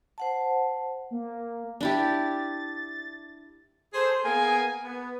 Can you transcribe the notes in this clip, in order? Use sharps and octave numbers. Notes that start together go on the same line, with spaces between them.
C5 F#5 A5
A#3
D4 E4 G4 A6
G#4 A4 C5
A#3 B3 G#4 A#4 G#5
B3